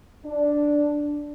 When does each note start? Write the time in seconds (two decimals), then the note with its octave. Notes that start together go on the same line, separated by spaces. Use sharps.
0.25 D4